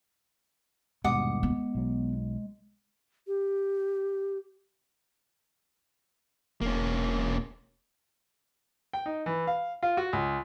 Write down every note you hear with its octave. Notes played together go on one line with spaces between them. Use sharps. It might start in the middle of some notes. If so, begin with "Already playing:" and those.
D#1 G2 B2 G#3 F#5 D6 D#6
B3
B1 F#3
G4
E1 A#3 C#4
G5
D#4
E3
F5
F4
F#4
C#2